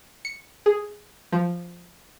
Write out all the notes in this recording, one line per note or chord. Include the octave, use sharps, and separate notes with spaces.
C#7
G#4
F3